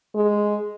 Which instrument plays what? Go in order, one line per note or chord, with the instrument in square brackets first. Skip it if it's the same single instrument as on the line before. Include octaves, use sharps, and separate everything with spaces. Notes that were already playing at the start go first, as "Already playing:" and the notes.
[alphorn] G#3